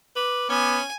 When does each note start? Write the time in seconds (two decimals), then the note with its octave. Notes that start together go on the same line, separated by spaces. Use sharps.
0.16 B4 D6
0.50 B3 C#4 G#5